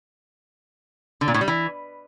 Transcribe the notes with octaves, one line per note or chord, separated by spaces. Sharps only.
D3
A#2
A2
G3
E3